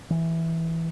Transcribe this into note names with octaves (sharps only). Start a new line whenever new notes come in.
E3